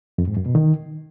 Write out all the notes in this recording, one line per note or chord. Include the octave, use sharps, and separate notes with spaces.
F2
G#2
F#2
B2
D#3